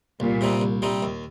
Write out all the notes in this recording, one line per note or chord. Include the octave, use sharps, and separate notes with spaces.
C2 A#2
C3 G3 C4 D#4
C2
C3 G3 C4 D#4
D#2